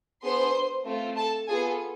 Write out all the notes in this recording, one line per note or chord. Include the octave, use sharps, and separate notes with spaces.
B3 D4 G#4 C5 C6
A3 C4 F4
A4 A5
B3 F4 G#4 A4 G#5